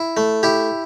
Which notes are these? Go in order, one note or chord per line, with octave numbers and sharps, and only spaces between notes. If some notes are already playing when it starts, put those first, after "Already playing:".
Already playing: E4
A3
E4 G4